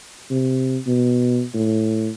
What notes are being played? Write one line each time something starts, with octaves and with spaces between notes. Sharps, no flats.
C3
B2
A2